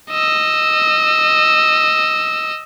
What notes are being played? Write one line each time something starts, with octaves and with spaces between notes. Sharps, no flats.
D#5 E6